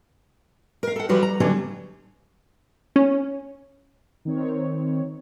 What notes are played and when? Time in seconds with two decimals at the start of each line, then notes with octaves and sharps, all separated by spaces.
0.83 A#4 F5
0.96 A4 F#5
1.09 E3 F3 G3 F#4 B4 C#5
1.23 A#5
1.40 D3 F#3 G3 B3 C#4 D4
2.96 C#4
4.25 D#3 C4 C#5